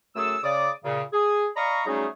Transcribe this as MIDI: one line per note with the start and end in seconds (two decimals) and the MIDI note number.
0.16 0.37 42
0.16 0.37 57
0.16 0.37 68
0.16 0.37 69
0.16 0.37 88
0.43 0.69 49
0.43 0.69 74
0.43 0.69 86
0.43 0.69 87
0.83 1.02 46
0.83 1.02 49
1.13 1.46 68
1.56 1.81 74
1.56 1.81 75
1.56 1.81 77
1.56 1.81 82
1.56 1.81 83
1.56 1.81 85
1.86 2.06 54
1.86 2.06 55
1.86 2.06 57
1.86 2.06 61
1.86 2.06 63
1.86 2.06 68